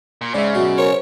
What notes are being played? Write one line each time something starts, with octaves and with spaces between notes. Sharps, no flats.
A#2
G#2 C#3 D5 E5
F#2 B2
A#4 C5 C#5